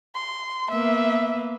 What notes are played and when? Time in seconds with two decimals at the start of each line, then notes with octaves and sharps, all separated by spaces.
0.15 C6
0.71 A#3 B3 E5